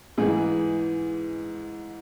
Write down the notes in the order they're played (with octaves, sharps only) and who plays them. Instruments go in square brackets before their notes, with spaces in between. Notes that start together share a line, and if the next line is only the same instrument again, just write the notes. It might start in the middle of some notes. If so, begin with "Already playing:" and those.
[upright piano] G#2 E3 G#4